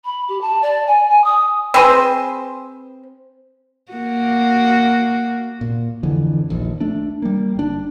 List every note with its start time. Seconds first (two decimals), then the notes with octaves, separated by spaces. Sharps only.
0.05 B5
0.28 G4
0.41 A5
0.62 D5
0.87 G#5
1.09 G#5
1.24 D#6
1.74 C4 G#4 B4 C5
3.93 A#3 F#4
5.61 A#2
6.03 F2 D3 E3
6.49 D#1 A#1 D#2
6.80 A3 D4
7.22 G3 A#3
7.55 G1 D4